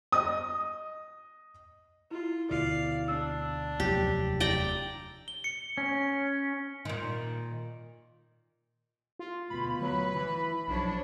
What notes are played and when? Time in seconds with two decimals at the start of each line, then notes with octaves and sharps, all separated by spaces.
0.12 D#5 D#6
2.11 E4 F4
2.51 D2 B2 D5 F5
3.08 D4 E6
3.80 F1 D#2 F#3 G4
4.40 D5 G5 A#5
5.28 G7
5.44 C#7
5.78 C#4
6.85 A#2 D#3
9.19 F4
9.50 D2 B2 B5
9.81 F#3 B4
10.15 E3
10.68 B1 F3 D4 C#5